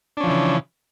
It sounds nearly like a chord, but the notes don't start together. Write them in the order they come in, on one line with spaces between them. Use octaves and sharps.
D4 C#4 F3 E3 C#3